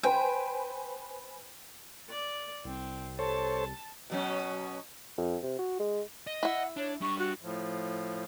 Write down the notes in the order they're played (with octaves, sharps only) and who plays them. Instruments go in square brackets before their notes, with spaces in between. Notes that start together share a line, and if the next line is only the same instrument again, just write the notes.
[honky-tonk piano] B4 C5 G#5 [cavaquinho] G5
[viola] D5
[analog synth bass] C2 [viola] C4
[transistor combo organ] A4 C5 C#5 [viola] A5
[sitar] B2 F#3 C#4
[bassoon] F2
C3
F#4
G#3
[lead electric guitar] D#5
[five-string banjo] E4 E5 [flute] F#5
[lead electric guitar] D4 [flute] C#5
[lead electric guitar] G3 D4 [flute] C#6
[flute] F#4
[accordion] A2 F3